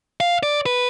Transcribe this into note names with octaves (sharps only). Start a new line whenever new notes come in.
F5
D5
B4